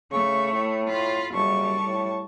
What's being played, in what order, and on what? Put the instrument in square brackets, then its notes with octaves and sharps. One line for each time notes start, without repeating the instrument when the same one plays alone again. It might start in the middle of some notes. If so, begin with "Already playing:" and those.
[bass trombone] C#3 [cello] A3 [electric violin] C#6
[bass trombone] A2
[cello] F4 [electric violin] B5
[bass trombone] F#1 [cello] G3 [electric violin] A5 C#6
[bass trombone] A2